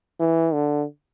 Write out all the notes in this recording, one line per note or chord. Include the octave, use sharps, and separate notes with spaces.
E3
D3